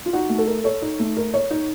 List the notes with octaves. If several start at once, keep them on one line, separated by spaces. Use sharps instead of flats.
F4
D#4 F#4
A3
A4
A#4
A4 C#5
D#4
A3
A#4
C#5
D#4